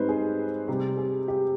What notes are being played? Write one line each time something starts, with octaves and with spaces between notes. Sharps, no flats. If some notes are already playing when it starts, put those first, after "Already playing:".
Already playing: G#2 G3 C4 D#4 B4 C5
G#4
C3 G3 C4 G4
G#4
G4